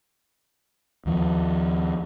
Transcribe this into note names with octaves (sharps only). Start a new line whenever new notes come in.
D#2 F3